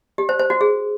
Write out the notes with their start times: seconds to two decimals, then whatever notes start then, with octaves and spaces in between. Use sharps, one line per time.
0.18 G4
0.29 C5
0.39 C5
0.50 F#4
0.61 G#4